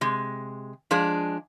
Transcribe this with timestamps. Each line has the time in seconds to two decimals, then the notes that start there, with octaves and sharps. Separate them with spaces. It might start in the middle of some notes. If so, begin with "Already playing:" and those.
0.01 C3 G#3
0.91 F3 G#3 D4 G#4